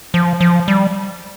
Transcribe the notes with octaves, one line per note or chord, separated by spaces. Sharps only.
F3
F3
G3